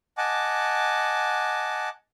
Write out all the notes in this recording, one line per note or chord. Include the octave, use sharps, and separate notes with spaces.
D#5 F#5 G#5 A5 D6